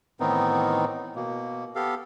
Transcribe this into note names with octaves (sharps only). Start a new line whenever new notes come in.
A2 D#3 E3 B3 C4 D#4
B2 A#3
B3 G4 A4 F5